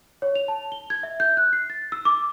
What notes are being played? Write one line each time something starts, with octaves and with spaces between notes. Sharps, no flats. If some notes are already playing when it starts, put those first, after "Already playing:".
C#5
F7
A5
G7
G#6
E5
G6
F#6
C7
A6
E6
D6